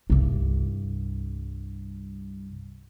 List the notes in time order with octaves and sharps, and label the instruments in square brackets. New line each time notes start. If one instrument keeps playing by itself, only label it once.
[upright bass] C2 G2